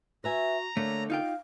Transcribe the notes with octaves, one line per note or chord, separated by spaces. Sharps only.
F#4 B4 E5 G#5 A#5
D3 A3 A#3 C#5
D#4 F4 F5 G5